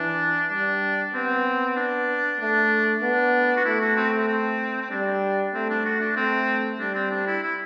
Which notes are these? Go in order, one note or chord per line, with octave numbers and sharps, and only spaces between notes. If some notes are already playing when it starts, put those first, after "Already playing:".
Already playing: E3 D4
G3 D4
B3 C4
D4
A3 D4
B3 D4
F#4
A3 E4
F#4
C4
C4
C4
C4
G3 D4
A3 C4
D4
F#4
D4
A3 C4
G3 D4
C4
D4
E4
E4